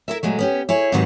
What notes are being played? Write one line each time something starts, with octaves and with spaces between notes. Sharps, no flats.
E4 A#4 E5
A#2 F#3 G#3 A3
B3 C#4 G4
E4 G#4 C#5
G#2 C3 D#3 F#3 B4 C#5